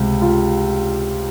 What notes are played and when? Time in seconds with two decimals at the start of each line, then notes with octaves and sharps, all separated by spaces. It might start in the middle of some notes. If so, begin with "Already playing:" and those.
Already playing: C#2 C3
0.21 F4